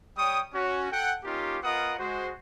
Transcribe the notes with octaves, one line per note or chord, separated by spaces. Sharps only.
G3 C#5 G5 C#6 D#6
C#4 F#4
A4 F#5 G5
A#3 C#4 D#4 F4 G4
B3 F4 A#4 D#5 F#5 D#6
G#3 F#4 C5